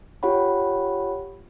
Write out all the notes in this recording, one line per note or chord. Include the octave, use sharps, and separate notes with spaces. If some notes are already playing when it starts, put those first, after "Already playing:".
F4 G4 C#5 F#5 B5